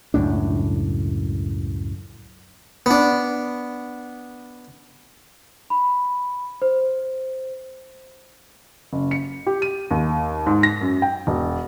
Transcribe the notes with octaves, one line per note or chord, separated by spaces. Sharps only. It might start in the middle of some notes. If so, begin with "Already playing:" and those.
C#2 F#2 A2 D4
B3 D4
B5
C5
F#1
C#7
G4
D#7
D#2
G#2
A#6
F#2
G5
E1